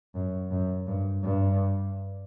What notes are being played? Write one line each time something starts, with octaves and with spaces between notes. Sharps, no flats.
F#2
F#2
G2
G2